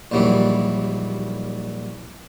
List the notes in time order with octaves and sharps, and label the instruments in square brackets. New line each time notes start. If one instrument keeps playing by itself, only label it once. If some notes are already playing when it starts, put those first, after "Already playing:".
[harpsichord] A#1 D#2 E3 F#3 G3